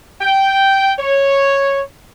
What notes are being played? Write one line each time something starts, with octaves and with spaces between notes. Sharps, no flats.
G5
C#5